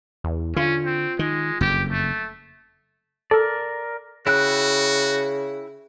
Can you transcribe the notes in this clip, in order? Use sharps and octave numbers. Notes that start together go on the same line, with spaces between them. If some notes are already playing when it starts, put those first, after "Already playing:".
E2
D3 C#4 F4
C4
D#3 G#3
F#1 F2 G4
A3
A4 A#4 D5
C#3 E4 F#4 G5 F#6